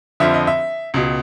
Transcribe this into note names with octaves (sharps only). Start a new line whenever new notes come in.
F2 D3 F3 E5
D#5
E5
C#2 B2